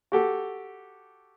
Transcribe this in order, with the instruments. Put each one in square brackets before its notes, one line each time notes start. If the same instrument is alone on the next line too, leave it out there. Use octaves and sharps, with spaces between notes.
[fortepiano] F#4 G4 A4